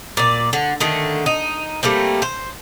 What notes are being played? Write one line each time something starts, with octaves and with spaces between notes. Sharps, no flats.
A#2 D5
D3
D3 D#3 A3
D#4
G3 A3 A#3 C4
C5